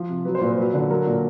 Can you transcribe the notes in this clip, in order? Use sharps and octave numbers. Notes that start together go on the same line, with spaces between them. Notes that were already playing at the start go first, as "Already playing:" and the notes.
Already playing: F3
C3
F#3 B4
C5
A#2 B4
C5
F#3 B4
D3
F#3 A#4
A#2